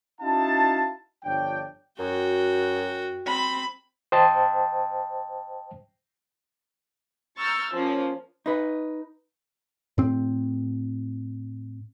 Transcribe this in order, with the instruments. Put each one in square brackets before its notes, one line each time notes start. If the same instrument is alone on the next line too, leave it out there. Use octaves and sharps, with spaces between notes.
[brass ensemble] C#4 D#4 E4 F#4 F5 A5
G1 F3 D4 C#5 G5
[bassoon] F#2 [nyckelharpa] F#4 G5
[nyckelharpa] C4 [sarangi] B5
[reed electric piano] C5 D#5 G5 A5
[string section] A#5 C#6 E6 F6 G6 A6
F3 A#3 C#4
[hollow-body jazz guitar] D#4 B4
[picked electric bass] A2 C4